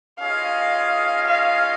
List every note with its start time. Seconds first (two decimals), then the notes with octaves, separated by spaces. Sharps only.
0.20 C#4 F4 G#4 D#5 F5
1.27 F5